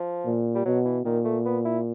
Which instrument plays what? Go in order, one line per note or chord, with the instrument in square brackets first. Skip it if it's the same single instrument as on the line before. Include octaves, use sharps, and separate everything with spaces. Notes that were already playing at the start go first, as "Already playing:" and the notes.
Already playing: [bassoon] F3
[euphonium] A#2
[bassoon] G3
[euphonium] B2 [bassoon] F#3
[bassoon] E3
[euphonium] A#2 [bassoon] D#3
[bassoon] A3
B3
E4